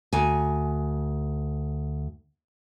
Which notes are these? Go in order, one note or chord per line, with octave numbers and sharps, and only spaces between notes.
D2 G#5